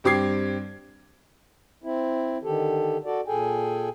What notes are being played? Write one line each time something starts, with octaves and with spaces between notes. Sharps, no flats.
G2 C4 G4 D6 G#6 C7
C4 E4
D3 D#3 G4 A4
F#4 A4 D5
A#2 G#4 A4 G5 G#5